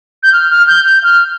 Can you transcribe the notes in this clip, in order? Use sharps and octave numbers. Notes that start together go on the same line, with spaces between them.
G6
F6
F6
G6
G6
F6